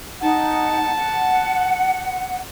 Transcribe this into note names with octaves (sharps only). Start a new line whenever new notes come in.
D#4 F#5 A5
F#5